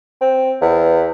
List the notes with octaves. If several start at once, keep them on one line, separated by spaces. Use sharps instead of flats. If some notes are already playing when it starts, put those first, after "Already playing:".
C4
E2